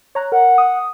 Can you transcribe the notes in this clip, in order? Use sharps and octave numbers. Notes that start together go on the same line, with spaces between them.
C#5 A#5 F#6
A#4 F#5
D#6